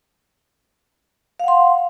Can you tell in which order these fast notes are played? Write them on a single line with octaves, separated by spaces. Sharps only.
F5 F#5 C6